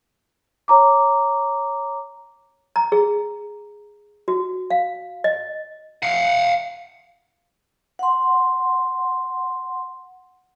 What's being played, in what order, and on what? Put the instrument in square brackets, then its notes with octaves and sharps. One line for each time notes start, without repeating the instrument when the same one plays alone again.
[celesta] C#5 A#5 D6
[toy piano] A#5
G#4
F#4
F5
D#5
[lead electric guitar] F5 F#5
[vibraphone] F#5 C6